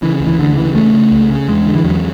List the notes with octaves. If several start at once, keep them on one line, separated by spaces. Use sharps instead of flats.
C#3 E3
D2
E3
D2 D3
C#3 E3
C#3 A3
C#3
C#2
C#3
E2 G#3
D3
E3
E2 F#3